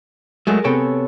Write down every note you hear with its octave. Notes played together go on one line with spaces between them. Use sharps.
F#3 G#3 A3 G#4 A#4
C3 B3 A4 C#5 G5 A5